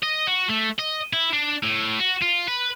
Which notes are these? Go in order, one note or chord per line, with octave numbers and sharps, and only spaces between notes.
D#5
F#4
A3
D#5
E4
D4
A2
F#4
F4
B4